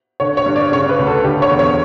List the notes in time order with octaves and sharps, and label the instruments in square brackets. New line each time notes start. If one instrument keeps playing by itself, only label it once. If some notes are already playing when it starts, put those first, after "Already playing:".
[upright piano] D3 C#5
C#5
G2
D5
C#3 C#5
B4
D2
A4
D3 G4
C#5
E2
C#5